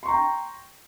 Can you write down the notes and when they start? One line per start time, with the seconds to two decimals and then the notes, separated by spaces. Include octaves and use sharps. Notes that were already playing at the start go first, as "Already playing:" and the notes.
0.03 C6
0.05 C#6
0.08 A#5
0.11 G5